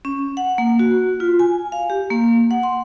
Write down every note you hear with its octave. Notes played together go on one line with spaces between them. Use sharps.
C#4
F#5
A#3
F#4
F4
G#5
F5
G4
A#3
F#5
C6